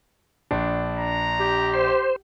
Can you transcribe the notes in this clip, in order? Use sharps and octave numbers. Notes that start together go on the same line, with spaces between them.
A#1 D4
A#5
G4
C5